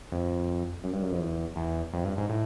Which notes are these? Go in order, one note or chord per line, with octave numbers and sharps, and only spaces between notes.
F2
F#2
G2
F#2
F2
E2
E2
F2
G2
G#2
A2